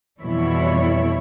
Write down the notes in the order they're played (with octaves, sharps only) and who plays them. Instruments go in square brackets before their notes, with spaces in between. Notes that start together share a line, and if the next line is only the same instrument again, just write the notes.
[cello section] F2 B2 E3 G3 E4 C#5